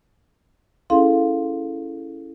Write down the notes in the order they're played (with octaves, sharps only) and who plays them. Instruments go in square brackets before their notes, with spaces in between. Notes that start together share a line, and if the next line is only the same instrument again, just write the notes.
[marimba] C#4 E4 G#4 A4 F5 C6